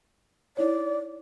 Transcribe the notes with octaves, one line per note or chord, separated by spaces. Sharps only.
D#4 E4 C#5 D5